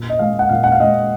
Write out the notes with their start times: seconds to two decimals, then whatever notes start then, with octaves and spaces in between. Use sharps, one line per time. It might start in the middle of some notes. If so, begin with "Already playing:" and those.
Already playing: A#2
0.09 D#5
0.19 G#3 F5
0.39 F#5
0.49 A#2 F5
0.64 F#5
0.72 F5
0.80 G#3 D#5